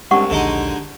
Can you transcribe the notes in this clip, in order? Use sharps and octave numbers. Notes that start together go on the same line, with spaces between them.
C2 G#3 C#4 D4 G4 F#5 C#6
A#1 D#2 D3 G#3 D#4